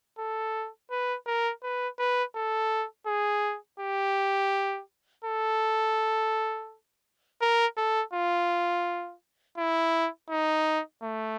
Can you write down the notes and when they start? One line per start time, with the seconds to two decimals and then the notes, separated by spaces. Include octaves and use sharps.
0.19 A4
0.91 B4
1.27 A#4
1.63 B4
1.99 B4
2.36 A4
3.07 G#4
3.80 G4
5.25 A4
7.42 A#4
7.77 A4
8.14 F4
9.58 E4
10.30 D#4
11.03 A3